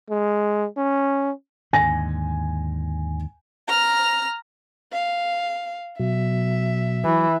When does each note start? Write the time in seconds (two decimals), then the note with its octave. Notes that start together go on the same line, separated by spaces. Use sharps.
0.10 G#3
0.77 C#4
1.73 D#2 G#2 D3 G#5 A#6
3.68 A#5 F6
4.93 F5
6.00 B2 F#3 E5
7.05 E3 F#3